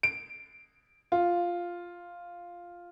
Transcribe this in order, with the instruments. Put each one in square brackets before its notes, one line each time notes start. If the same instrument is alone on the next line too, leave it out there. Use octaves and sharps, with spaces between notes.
[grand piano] D7
F4